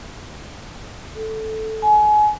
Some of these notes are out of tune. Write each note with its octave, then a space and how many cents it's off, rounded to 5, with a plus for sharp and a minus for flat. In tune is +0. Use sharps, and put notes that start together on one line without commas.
A4 -5
G#5 +30